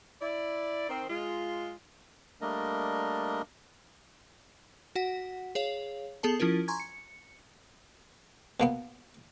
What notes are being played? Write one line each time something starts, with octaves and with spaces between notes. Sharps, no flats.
E4 D5
D#3 C4
G#3 F4
G3 A3 A#3 D4 A#4 D#5
F#4 F#5 B6
G#4 C#5 F5
B3 G#4 A4 A5
F3 C#4 E4 F4 A#4
G#5 A#5 C6 C#6 G#6
C#7
B2 A#3 B3